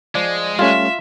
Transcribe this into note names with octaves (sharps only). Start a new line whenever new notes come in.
F3 G#3 D5
G3 A3 C#4 F4 E5